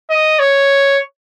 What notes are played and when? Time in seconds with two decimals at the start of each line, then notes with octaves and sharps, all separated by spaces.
0.10 D#5
0.39 C#5